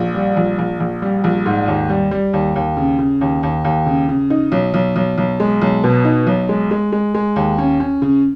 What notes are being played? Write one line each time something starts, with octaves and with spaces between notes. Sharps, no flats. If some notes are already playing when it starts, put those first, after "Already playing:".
Already playing: A#1
G3
A#1
A#1
A#1
G3
A#1
G#2
D#2
G3
G3
D#2
D#2
C#3
C#3
D#2
D#2
D#2
C#3
C#3
D#4
B1
B1
B1
B1
G#3
B1
B2
D#4
B1
G#3
G#3
G#3
G#3
D#2
C#4
C#4
C#3